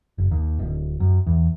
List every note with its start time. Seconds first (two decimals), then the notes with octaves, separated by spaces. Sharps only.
0.18 F#1
0.31 D#2
0.59 D1
1.00 F#2
1.26 E2